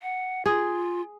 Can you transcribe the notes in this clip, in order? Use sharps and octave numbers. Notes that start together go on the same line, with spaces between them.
F#5
F4 G#4